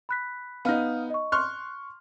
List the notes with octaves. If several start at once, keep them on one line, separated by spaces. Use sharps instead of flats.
B5 F#6 B6
B3 D#4 F5 F6
D#5 C#6
C6 C#6 F6 F#6